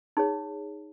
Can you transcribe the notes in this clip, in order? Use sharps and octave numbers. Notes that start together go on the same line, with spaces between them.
D#4 G#4 C#5